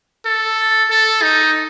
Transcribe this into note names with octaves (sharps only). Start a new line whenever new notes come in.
A4
A4
D#4